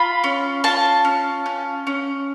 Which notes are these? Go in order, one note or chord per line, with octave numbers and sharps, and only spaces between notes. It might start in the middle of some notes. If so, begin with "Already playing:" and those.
Already playing: F4 B5
C#4
F4 A5
C#4
C#4
C#4